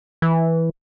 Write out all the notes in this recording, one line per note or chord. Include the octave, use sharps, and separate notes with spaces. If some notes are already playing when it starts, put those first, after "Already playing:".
E3